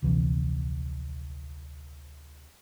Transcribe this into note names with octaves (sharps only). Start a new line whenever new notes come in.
D1 A#1 C3 E3